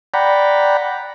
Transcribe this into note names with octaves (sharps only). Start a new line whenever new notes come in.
D5 F#5 G5 A#5 B5